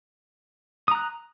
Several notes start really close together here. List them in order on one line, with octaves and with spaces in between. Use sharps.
D#6 A#5 F#6